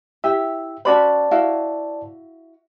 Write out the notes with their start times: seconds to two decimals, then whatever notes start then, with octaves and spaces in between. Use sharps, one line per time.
0.24 E4 G4 E5
0.85 C#4 F#4 C5 D5 A5 B5
1.31 E4 F#4 F5